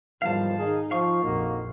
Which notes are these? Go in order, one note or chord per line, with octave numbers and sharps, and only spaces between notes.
E2 G#2 D#3 F3 G3 F5 A5
D#3 D#4 G#4
F3 F5 C#6
A#1 F2 A#3 D#4 F#4